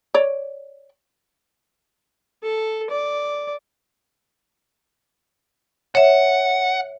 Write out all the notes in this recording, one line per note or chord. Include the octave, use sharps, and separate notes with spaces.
C#5 D5
A4
D5
C#5 E5 F#5